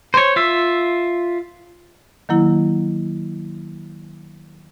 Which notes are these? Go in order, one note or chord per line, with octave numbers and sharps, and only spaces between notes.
C5 C#5
F4 E5
D#3 F#3 A#3 E4